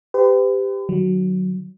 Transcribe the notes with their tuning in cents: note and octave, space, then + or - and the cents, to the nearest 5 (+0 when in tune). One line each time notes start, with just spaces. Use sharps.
G4 +10 B4 +45
D#3 -45 F#3 +0